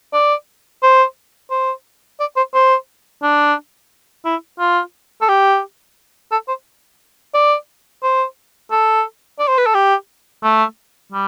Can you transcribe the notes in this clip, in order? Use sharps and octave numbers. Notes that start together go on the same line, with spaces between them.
D5
C5
C5
D5
C5
C5
D4
E4
F4
A4
G4
A4
C5
D5
C5
A4
D5
C5
B4
A4
G4
A3
G3